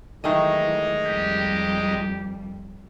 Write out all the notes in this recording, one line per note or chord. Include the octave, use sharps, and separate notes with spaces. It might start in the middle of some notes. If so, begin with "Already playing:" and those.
D#3 E3 F#3 G#3 A3 D#4 D#5
F2 G3 G4